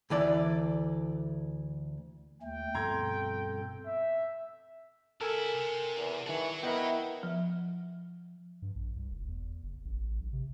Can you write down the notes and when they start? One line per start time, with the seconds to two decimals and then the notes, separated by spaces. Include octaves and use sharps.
0.10 D2 E3 D5
2.42 D#2 A3 G5
2.75 G2 B2 F3 C4 A4 A#5 C6 G#6
3.86 E5
5.21 C2 E4 A4 A#4 G#5 E6
5.55 C3
5.98 E2
6.27 D#3 E3 F#4 C#5 A5
6.63 B3 E4 A#4 D#5 F#5 G5
7.23 F3
8.62 G2
8.75 A#1
8.96 C2
9.11 F1
9.28 E2
9.64 F#1
9.85 A1
10.20 B1
10.33 C3